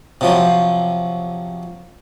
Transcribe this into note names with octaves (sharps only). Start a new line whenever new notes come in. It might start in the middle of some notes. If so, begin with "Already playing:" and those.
C3 F3 F#3